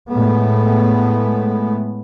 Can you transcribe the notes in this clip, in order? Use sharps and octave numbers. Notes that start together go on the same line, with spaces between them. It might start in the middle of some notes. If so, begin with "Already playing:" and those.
A2 G#3 A3 B3